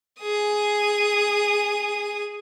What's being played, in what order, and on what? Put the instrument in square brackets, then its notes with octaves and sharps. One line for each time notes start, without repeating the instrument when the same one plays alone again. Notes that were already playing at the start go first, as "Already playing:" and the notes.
[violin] G#4 D#6